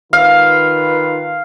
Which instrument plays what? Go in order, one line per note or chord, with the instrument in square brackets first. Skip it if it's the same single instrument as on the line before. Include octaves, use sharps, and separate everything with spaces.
[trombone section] D#3 F4 B4 [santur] F5